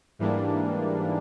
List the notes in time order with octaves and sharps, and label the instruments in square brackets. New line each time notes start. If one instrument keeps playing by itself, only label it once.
[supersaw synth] G#2 E3 G3 A#3 D4